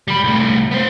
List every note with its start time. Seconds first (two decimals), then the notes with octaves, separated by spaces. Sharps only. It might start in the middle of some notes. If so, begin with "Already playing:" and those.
0.08 G3 B5
0.24 C2 A3
0.71 B3 C5